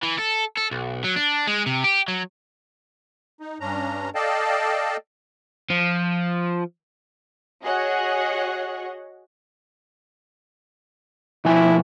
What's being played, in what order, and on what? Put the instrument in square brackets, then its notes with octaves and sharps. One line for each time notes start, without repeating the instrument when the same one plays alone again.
[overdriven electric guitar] E3
A4
A4
B1
F#3
D4
G#3
C3
G4
F#3
[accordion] D#4
G2 C#4 D4 A#5
A4 D5 D#5 F5 G5 A5
[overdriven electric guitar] F3
[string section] F#4 G#4 C#5 D#5 F#5
[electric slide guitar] B2 F3 G#5 [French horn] E4